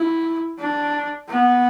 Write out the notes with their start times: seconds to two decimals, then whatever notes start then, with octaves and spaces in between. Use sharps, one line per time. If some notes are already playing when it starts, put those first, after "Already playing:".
Already playing: E4
0.59 D4
1.29 B3